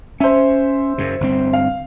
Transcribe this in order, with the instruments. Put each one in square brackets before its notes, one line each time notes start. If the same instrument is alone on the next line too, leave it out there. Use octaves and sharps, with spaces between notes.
[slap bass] C#4 [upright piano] C5 E5
[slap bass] F#2 C#3
G1 C3 C4
[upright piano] F5